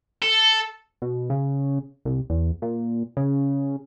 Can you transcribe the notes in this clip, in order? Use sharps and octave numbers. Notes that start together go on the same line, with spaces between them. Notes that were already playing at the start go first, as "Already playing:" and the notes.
A4
B2
C#3
C2
E2
A#2
C#3